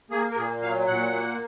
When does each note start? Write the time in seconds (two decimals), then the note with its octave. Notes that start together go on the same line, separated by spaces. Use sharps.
0.11 A#3 G#4
0.31 A#4
0.36 A#2 G#4
0.61 F#3 F5
0.87 A#2 F#5
1.12 A#3